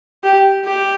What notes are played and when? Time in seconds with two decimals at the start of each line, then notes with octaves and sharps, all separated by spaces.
0.24 G4
0.65 G4